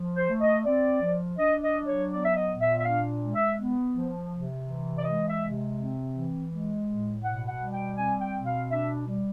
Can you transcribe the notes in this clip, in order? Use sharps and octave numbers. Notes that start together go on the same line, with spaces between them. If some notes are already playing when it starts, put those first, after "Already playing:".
Already playing: F3
C5
A3
D#5
C4 D5
F3
D4 D#5
D#5
F#3
C#5
B3 D5
E5
D#5
A#2
E5
E5
D4 F5
G#3
E5
B3
F3
C3
E3
D5
G#3 D#5
E5
C3
C4
E3
G#3
A2
B2 F#5
F#5
G3
G5
C4 G#5
G5
B2
F5
D4 E5
G3